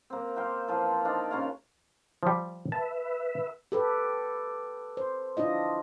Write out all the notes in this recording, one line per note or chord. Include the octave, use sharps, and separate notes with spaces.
A#3 C4
C5 F5 G5 A#5
E3 F3 F4
D4 D#4 D5 F5
C#3 A#3 C#5 F5
F3 G3
B4 E5 A5
G4 A4 B4
C5
D4 E4 F4 D#5